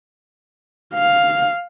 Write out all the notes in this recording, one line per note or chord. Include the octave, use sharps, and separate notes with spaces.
F5